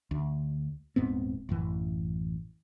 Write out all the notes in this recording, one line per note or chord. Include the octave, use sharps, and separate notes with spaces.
D2
D#1 G#2 B3 C4
A1 F#2 E3